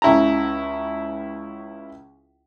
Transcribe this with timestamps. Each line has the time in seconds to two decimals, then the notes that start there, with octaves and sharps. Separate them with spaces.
0.02 C#2 C#3 E4 A5 A#5